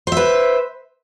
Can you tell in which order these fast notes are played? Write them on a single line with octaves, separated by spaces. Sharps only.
C5 E5 B4